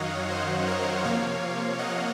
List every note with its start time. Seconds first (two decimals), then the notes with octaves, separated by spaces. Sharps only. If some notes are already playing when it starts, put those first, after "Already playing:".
Already playing: F#2 D#3 F#3 C#5 D#5 F5 F#5
0.29 C5 D#5
0.67 A#4 C#5
1.05 C3 F3 A#3 C#5 F5
1.79 D#5 F#5